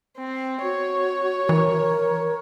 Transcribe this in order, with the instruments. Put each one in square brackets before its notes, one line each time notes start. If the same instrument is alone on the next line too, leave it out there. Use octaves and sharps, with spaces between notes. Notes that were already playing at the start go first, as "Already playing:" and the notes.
[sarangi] C4
[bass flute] F#4 [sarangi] C#5
[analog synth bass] E3 [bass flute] A#4